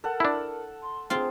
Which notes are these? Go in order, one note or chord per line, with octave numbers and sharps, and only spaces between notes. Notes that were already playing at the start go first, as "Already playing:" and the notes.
A4 A#4 F#5
D4 E4
C6
C4 F4 G#4